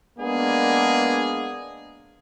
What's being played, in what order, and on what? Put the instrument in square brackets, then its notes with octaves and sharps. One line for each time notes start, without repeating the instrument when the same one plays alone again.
[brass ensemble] G#3 A#3 B3 D4 G#4